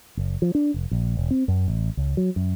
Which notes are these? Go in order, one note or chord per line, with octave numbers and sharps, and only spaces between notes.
F#1
F3
D4
F1
A#1
E1
C4
F#2
A1
C#2
F#3
F#2